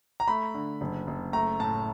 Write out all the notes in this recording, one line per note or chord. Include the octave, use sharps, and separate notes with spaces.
A#5
A3 B5
D3
F#1
F#1
A3 A#5
A2 A5